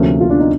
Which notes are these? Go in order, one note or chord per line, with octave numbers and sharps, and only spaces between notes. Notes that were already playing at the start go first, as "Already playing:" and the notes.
Already playing: D2 C3 F3 A#3 C#4
F4
D4
D#4